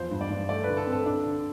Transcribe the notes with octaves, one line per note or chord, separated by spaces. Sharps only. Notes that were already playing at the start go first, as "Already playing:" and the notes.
Already playing: E2 F3 C5
G2
D5
G2
A3 D5
D3 B4
A4
C4
A4
D4
D3